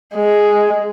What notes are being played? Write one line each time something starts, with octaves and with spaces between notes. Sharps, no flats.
G#3